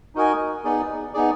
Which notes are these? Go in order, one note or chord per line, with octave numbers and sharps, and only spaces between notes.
D#4 F#4 A#4 D#5 G#5
B3 D#4 G#4 D5
B3 D#4 G#4 D5